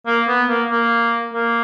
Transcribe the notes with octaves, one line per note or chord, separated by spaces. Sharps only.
A#3
B3
A#3
A#3
A#3